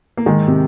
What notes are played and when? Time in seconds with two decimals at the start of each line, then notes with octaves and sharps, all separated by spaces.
0.17 A#3
0.26 D#3 G#3
0.48 C3